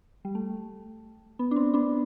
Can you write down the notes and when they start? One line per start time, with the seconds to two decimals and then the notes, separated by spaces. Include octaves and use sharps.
0.25 G3
0.35 A3
1.39 B3
1.51 D4
1.56 C4
1.74 B3 D4